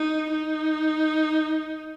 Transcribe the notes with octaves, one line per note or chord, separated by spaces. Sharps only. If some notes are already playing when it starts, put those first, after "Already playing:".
Already playing: D#4
D#4